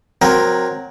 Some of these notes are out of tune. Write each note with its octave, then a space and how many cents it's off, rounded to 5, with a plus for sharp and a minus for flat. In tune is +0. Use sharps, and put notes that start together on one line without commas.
F#3 -10 C4 +0 A#4 +5